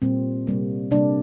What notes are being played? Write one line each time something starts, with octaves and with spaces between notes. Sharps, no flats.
A#2 G3 A#3 C4
C3 G3 A#3
C3 G3 A#3 D4